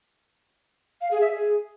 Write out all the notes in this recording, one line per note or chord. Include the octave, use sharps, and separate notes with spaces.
F5
G#4
E5
G#4